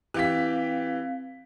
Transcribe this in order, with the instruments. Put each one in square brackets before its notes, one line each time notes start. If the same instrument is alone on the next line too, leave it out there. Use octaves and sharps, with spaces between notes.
[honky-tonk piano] E3 G4 B6 [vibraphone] C4 F5